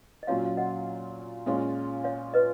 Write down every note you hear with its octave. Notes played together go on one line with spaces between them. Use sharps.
D#5
A#2 F#3 C#4 F4 C#5 F5
F5
D#5 F#5
A#2 G#3 C#4 F4
C#5 F5
B4 D#5